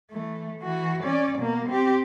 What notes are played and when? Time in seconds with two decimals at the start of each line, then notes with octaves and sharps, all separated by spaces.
0.11 E3 A3
0.60 E3 F#4
1.03 C#4 D5
1.38 B2 A#3
1.68 C4 G4